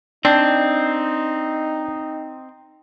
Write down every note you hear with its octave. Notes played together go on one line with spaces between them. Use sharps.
C4 D4 D#4